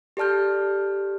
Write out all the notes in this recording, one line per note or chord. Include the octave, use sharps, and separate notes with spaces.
G4 A4 D5 A5 F6 G6